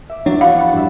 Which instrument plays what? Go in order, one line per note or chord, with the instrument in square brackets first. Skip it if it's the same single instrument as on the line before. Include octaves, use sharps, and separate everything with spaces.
[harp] E5 D6
[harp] E2 F3 [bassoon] F#3 [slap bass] D4
[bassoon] F#4 [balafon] F5
[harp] B5 F#6 A6
G2 E5